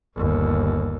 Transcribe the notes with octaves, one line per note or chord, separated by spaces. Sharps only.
G1 D#2